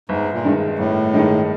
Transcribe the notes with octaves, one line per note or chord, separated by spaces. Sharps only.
G1 G#2
A#2
G2 D#3 G#3
G1 A2
G2 D#3 G#3